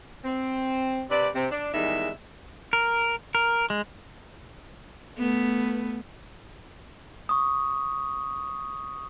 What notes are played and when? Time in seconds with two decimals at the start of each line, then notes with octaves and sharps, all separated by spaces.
0.25 C4
1.10 C3 C4 B4 D5
1.35 C3 C4
1.51 D4
1.73 E2 D#3 G3 G#3 D#4 E5
2.73 A#4
3.35 A#4
3.70 G#3
5.18 A3 B3
7.29 C#6 D#6